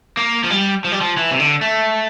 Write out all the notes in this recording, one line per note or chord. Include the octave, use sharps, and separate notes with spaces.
A#3
F3
G3
F3
G3
F3
E3
C3
D3
A3